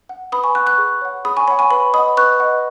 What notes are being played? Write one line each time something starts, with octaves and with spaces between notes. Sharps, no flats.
F#5
B4 B5 D#6
G#5 C#6
F#5 C#6 F#6
C#6 F#6
G#4
C#5 F#5
G#4 B5 D#6
G#5 C#6
C#5 F#5 B5
G#5 C#6
B4 B5
D#5 F#5 B5 D#6
B4 C#6 F#6
D#5 F#5